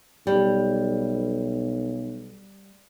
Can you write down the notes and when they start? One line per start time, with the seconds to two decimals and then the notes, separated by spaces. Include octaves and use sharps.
0.27 B1 G3